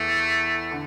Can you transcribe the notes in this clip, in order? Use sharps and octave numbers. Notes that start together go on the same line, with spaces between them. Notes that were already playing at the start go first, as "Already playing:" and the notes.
Already playing: E2 E3 A3
D3